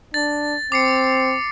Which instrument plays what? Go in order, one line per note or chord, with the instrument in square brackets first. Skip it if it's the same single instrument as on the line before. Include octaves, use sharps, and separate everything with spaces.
[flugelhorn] D4 [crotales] A6
[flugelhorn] C4 [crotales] D6 C7 C#7